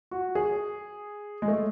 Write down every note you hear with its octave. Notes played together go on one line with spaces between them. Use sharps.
F#4
G#4
G#3
A3